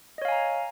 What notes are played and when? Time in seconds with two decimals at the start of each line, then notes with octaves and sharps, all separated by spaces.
0.18 D#5
0.22 C#5
0.25 F5
0.28 G#5
0.32 A#5